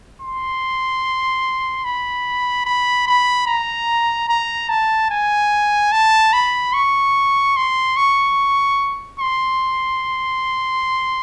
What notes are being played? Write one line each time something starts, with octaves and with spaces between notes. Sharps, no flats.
C6
B5
B5
B5
A#5
A#5
A5
G#5
A5
B5
C#6
C6
C#6
C6